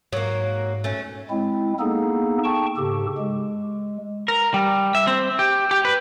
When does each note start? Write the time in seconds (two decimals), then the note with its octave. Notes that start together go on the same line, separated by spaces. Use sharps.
0.13 G#2 F#3 A#3
0.84 A3 C#4
1.30 G#3 C4 E4
1.80 A#3 B3 D#4 G#4 A4
2.44 G5 A5 C#6
2.77 G#2 C#3 G4 A4
3.18 G#3
4.28 A#4
4.54 G3
4.95 E5
5.07 C4
5.39 G4
5.71 G4
5.85 B4